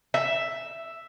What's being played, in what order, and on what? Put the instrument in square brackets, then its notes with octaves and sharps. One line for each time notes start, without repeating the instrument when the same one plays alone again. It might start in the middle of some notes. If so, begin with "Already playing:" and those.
[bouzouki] E5